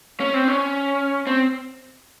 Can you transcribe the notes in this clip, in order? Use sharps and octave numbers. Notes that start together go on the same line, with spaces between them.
C#4
C4
C#4
C4